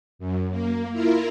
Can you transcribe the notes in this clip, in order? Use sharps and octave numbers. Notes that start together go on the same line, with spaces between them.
F#2
A#3
E4 F4 A#4